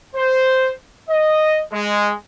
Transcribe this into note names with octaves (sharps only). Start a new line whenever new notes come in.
C5
D#5
G#3